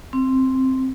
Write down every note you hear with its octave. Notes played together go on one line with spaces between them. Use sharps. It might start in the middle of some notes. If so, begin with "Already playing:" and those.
C4